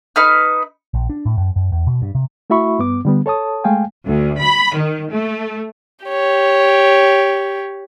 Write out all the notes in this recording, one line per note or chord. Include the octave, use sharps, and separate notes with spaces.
D#4 B4 F6
A#1
D4
A2
F#2
F#2
E2
B2
G2
C3
A3 E4 F#4 E5 B5 C#6
G2 B3 D6
D3 G3 B3
A4 C#5 A5 D#6
G#3 A3 F5 G5 G#5
D2
B5
D#3
A3
G4 C#5